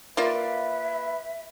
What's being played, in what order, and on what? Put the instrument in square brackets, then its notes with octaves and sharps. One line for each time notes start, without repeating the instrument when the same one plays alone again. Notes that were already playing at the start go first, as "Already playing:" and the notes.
[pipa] A#3 F4 D5 [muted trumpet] B4 [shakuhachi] E5